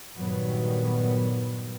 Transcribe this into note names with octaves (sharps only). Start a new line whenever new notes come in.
G2 A#2 D#3 F#3 G3 B3